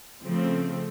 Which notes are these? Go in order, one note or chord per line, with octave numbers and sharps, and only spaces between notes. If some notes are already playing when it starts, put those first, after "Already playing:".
C#3 F3 A3 C4